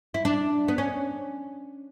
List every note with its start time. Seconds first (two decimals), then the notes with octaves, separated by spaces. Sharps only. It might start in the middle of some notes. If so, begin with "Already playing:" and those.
0.14 E4
0.25 D4
0.68 B3
0.78 C#4